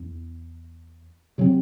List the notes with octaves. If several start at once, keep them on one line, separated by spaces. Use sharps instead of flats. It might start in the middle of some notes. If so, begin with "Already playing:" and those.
Already playing: E2
C3 F#3 C4